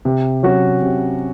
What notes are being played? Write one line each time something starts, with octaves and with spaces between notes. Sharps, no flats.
C3
F#3 C#4 F#4
C3